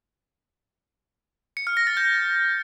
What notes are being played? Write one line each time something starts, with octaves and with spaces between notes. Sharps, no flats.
C#7
F6
A#6
A6
G6